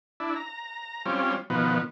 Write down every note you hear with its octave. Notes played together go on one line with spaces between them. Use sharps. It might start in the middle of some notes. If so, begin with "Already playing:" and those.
D4 E4
A#5
G3 C4 C#4 F4
B2 D#3 F3 B3